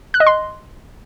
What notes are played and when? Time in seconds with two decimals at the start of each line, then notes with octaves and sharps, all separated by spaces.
0.14 F#6
0.20 D#5
0.27 C6